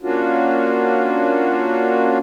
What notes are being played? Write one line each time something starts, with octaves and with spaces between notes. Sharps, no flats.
A#3 C#4 D4 F4 F#4